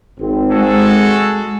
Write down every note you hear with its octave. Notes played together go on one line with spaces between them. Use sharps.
G#1 C4
G#3 F#4 G#4 A4